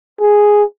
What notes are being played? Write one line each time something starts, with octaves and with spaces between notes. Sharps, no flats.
G#4